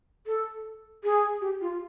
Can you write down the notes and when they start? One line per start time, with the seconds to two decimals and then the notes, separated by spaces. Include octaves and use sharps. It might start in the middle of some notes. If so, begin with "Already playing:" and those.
0.27 A4
1.04 G#4
1.41 G4
1.61 F4